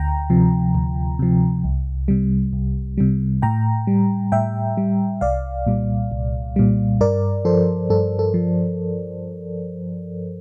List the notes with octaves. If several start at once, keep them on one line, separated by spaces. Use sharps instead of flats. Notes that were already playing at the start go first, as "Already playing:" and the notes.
Already playing: D2 G5 A#5
C3 F3
D2
C3 F3
C2
C3 G3
C2
C3 G3
A2 G5 A#5
G3
A2 E5 G5
G3
C2 D5 F5
A#2 G3
C2
A#2 G3
G2 A#4 D5
F3 A4 C5
G2 A4
A4
F3